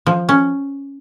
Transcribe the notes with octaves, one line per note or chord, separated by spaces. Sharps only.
F3
C#4